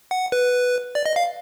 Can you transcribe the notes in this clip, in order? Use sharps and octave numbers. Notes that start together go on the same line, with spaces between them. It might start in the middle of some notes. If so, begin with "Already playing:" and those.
F#5
B4
D5
D#5
F5